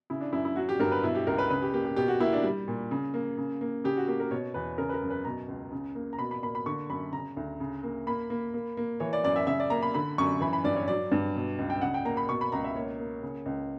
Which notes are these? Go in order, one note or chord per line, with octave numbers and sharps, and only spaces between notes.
C#3 E4
D4
F#2 E4
E4
F#3 F#4
G4
G2 A#4
B4
B2 E4
G4
C#2 A#4
B4
C#3 B4
G4
A#3 G4
G4
B2 G4
F#4
A#3 E4
D4
G3
A#2
C#3
A#3
C#3
A#3
C#3 G4
F#4
A#3 G4
A#4
B2 C#5
E2 B4
C#3 A#4
B4
A#4
F#2
B4
B2 A#5
C#2
C#3
A#3
A#5
B2 B5
B5
A#3 B5
B5
D3 C#6
F#2 B5
C#3 A#5
D2
C#3
A#3
A#3 B5
A#3
A#3
A#3
E3 C#5
D5
F#2 D5
E5
C#3 E5
D5
A#3 A#5
B5
D3 B5
F#2 C#6
E3 B5
B5
G2 D5
C#5
F#3 D5
G2
B2
C#2
G5
C#3 F#5
G5
A#3 A#5
B5
B2 C#6
B5
C#2 A#5
E5
A#3 C#5
A#3
C#3
C#2